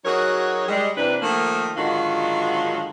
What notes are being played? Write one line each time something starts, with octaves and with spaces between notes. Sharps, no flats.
F#3 D#4 F#4 G#4 A#4 C#5
G3 G#3
C3 E3 A#3 C4 D4 B4
D#3 F3 A3 A#3
G#2 D3 D#3 F#3 F4 F#4